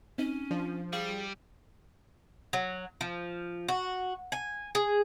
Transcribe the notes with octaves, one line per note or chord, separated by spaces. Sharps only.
C4 C#4 D#4
F3 D4
G3 G#4 F5
F#3
F3
F#4
G#5
G#4